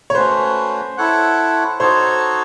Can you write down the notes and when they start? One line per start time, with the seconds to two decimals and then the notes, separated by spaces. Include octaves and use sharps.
0.10 C#5
0.15 A3 C#4 F#4 B4 C5
0.98 E4 A4 C#5 F#5
1.80 D#4 F#4 A4 C5 C#5